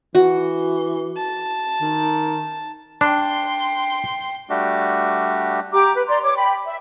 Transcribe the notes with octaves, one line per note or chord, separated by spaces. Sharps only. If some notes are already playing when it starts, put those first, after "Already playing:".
E3 F#4
A5
D#3
D4 G5 C6
G3 A3 D4 F#4 G4
G4 A#5 D6
B4
D5 A#5 C6
C#5 D6
G5 B5
E5